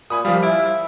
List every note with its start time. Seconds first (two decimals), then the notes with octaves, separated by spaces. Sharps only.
0.10 A#2 G#5 B5 D#6
0.25 F3 G3 F4
0.43 E4 D7